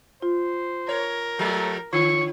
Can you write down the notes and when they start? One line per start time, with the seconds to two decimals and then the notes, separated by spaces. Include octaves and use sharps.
0.22 F4 C5
0.89 A#4 C#5
1.39 F3 G3 A3
1.93 D3 F4 C#5 C#6